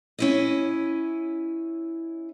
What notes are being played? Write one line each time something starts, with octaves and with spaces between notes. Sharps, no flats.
C#4 E4 D#5